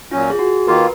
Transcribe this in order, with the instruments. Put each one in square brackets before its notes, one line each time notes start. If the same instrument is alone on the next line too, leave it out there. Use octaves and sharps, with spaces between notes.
[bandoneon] A#2 F#3 C#4 [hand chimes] F4
[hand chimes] G#4
F#4
[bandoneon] D#3 A#3 F4 [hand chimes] A#4
[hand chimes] B4